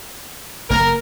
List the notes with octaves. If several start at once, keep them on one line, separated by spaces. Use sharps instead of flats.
F#1 A#3 A#4